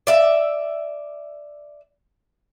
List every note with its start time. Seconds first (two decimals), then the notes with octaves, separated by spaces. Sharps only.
0.07 D5 E5